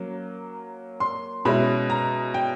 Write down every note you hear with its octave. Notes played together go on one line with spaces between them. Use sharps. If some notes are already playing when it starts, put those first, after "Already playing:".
Already playing: F#3 A#3 C#4
C6
B2 G#3 C#4 E4 B5
A#5
G5